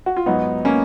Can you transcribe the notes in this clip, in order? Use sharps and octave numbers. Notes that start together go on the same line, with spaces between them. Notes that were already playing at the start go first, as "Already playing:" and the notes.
F#4
F4
G#2 F#3 B3 D#4
A#3 C#4